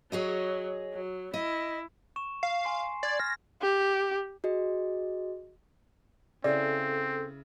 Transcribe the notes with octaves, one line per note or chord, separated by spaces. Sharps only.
F#3 G#4 C#5 D#5
F#3
E4 D#5
C#6 E7
F5 C7
G#5 C6
D5 G#6 A6
F6 A#6
G4
F#4 G#4 D#5
C#3 C4 E4 A4 D5